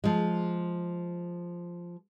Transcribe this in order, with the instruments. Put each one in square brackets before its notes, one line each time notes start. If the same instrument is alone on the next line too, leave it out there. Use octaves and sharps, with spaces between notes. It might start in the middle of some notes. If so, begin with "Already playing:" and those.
[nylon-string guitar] F3 G#3